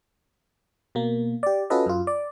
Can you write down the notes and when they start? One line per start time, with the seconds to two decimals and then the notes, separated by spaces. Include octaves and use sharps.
0.95 B2 A#3
1.43 G4 D5
1.70 C#4 F4 F#4 A4 B4 D#5
1.86 F#2 F4
2.07 D5